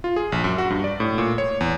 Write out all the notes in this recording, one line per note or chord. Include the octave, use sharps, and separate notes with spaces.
F4
G#4
A#1
F#2
F#4
G2
D5
A2
A#2
C#5
E2